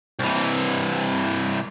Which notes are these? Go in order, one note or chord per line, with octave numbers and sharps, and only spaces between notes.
C2 E3